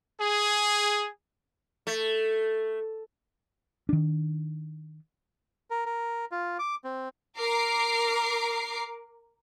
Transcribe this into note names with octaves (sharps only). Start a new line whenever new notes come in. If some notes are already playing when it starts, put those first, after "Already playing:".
G#4
A3
D#3 D4
A#4
A#4
F4
D6
C4
A#4 D6 C7